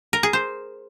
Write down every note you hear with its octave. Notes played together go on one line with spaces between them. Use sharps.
A#4
G#4
C5